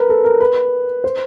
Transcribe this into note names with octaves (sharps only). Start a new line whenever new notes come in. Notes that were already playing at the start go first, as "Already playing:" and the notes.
Already playing: A#4 B4
A4
A#4
B4
C5